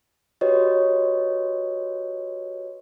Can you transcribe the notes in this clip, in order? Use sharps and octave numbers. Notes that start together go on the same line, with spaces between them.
F#4 G4 B4 C#5 D#5